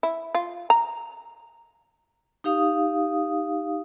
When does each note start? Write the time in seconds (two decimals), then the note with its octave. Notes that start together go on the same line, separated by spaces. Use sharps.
0.03 E4
0.35 F4
0.70 A#5
2.44 D#4 G4 F5 D#6